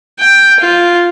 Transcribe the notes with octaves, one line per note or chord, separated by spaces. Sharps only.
G5
F4